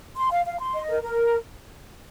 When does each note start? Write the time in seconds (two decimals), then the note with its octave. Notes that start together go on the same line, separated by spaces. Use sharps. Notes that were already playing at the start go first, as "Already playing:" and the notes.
0.16 C6
0.31 F5
0.45 F5
0.60 C6
0.74 D#5
0.89 A#4
1.03 A#4